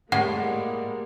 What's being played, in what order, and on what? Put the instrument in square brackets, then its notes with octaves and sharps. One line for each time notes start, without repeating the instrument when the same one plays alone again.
[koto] A2 [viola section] G3 G#3 A#3 [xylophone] F#5